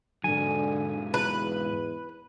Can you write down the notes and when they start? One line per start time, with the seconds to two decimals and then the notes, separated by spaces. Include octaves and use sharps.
0.24 G#2 D3 F#3 G#5
1.14 E2 B4